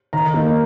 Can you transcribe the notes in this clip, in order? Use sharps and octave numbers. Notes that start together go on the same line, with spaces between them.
D#3 A#5
A#3 D#4